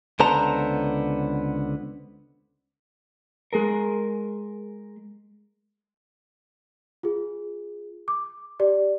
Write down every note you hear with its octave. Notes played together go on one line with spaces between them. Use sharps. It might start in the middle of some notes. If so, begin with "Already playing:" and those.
C#2 D3 B3 C5 A5 A#5
G#3 G#4 A#4
F4 G#4
D6
G4 D5